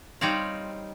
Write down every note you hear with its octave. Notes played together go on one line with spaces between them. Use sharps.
G3 C4 D#4 C#5 D5 F5